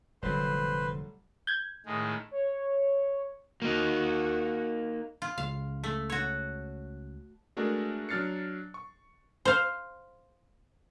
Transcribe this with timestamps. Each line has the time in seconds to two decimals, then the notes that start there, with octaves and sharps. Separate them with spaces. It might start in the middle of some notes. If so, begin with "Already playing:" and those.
0.23 F1 A#2 D3 F#3 G3 A3 B4 C5
1.47 G6 G#6
1.86 A2 D#3 G#3
2.31 C#5
3.62 A#3 D#4 F#4
5.22 F4
5.38 C#2 F5
5.84 A3
6.10 F#4 C#5
7.57 G#3 A3 D4 F#4 A#4
8.09 F#3 D4 F6 A6 C7 C#7
8.74 C#6
9.45 C5 F5